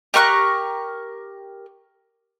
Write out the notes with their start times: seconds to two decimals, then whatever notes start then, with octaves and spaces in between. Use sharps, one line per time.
0.14 G4 A#4 C#6 F#6